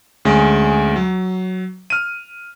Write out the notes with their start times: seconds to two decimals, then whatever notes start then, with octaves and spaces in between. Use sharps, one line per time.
0.25 D2 G#3 C#4
0.96 F#3
1.90 F6 D#7